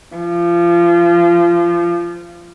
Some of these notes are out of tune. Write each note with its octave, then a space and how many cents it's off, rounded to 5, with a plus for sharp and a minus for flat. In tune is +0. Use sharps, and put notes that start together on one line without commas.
F3 -25